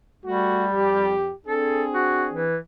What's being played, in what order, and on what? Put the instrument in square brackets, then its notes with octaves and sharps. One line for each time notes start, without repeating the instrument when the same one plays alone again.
[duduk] G3 [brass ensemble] A3 F#4
[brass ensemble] F2 G4
[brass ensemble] C4 D4 G#4 [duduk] A4
[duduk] F#4
E3